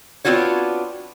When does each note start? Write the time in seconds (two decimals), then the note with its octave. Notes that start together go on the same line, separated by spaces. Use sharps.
0.25 B3 C4 D4 F4 F#4 C#5